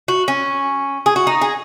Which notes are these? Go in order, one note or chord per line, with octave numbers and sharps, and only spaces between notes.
F#4
C#4
G#4
F#4
D#4
G#4